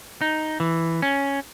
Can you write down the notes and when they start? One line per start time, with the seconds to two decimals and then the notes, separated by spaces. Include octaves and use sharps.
0.21 D#4
0.60 E3
1.02 C#4